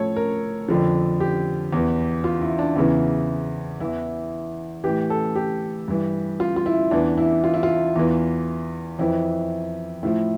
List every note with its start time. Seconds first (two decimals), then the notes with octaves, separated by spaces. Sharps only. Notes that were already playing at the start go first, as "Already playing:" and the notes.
Already playing: A2 F3 A4 C#5
0.16 A#4
0.68 F2 D3 F3
1.20 G4
1.73 E2 E3
2.24 F4
2.41 E4
2.59 D4
2.76 E2 C#3 E3 E4
3.80 E2 E3 E4
4.84 A2 E3 G4
5.10 A4
5.35 G4
5.88 G2 E3
6.40 F4
6.56 F4
6.66 E4
6.91 E2 E3 D4
7.18 E4
7.44 F4
7.54 E4
7.63 F4
7.96 E2 E3
8.99 F2 E3 E4
10.03 A2 F3 E4